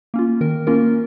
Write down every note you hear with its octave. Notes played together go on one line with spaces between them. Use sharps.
A#3 C#4 F4
D#3 A#4
A#3 C#4 F4 A#4